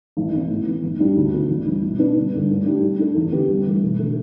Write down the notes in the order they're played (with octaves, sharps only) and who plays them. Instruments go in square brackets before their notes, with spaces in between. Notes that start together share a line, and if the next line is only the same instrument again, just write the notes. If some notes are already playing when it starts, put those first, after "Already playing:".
[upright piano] A1
A2 E3 B3
A2
E3 B3
A1
G2 G3 D4 G4
D2
D3 B3
A1
G2 E3
B2
B3 D4 B4
G1
G2 D3
A2
G3 D4
A2
A3 D4
E2
D3 B3 G4 B4
G1
G2 E3 A3
E1
D3 A3